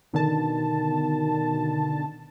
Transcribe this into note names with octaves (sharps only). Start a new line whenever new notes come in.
B2 D3 D#3 A5